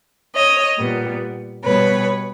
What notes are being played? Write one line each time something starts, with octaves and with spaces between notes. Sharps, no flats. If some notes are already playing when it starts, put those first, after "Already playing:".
C#5 D#5
A#2 G3 B3
B2 G3 B3 B4 C#5